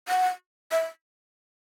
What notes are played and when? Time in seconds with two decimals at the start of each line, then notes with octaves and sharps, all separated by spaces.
0.08 F#5
0.72 E5